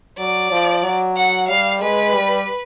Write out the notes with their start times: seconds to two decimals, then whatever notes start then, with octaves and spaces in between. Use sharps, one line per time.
0.18 F#3 D5
0.52 F3
0.84 F#3
1.17 F#5
1.49 G3 F5
1.82 G#3 B4
2.14 G3